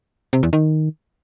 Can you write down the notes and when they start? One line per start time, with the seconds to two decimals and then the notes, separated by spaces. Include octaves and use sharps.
0.33 C3
0.43 E2
0.53 D#3